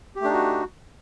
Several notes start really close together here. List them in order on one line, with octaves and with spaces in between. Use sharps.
G4 A3 D4 D#4 F#4